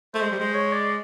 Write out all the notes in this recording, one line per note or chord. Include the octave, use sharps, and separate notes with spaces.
A3 C5
G#3
G3 C5
G#3
C#5
D5